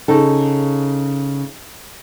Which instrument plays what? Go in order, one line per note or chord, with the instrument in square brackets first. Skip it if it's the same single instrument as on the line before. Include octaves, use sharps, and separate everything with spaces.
[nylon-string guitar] C#3 D#4 A4